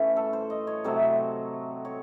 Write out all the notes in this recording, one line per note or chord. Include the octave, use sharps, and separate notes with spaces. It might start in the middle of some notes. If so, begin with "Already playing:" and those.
Already playing: A2 E3 A3 C#4
A4
C5
D#5
C#5
C3 F#3 A3 C5
C#5